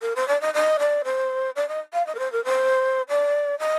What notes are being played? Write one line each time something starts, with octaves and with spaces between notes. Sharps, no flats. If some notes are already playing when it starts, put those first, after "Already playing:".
A#4
C5
D5
D#5
D#5
D5
C5
D5
D#5
F5
D#5
A#4
C5
A#4
C5
D5
D#5